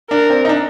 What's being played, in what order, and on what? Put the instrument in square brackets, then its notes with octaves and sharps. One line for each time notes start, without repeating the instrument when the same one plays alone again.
[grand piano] D4 [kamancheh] A#4
[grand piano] C4
D#4
D4